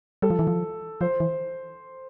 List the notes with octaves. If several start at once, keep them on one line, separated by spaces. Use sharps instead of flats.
G3 A4
F3
E3
F3
F3 C5
E3